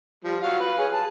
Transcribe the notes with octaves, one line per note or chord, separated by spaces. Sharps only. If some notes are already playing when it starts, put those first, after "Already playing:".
F3 G3
F#3 F#4 F5
B4
G#4 C#5
A5